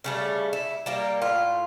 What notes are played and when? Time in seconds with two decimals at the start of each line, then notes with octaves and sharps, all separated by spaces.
0.04 C#3 G3 A3
0.53 E4
0.86 G3 A#3 G4
1.22 A2 F4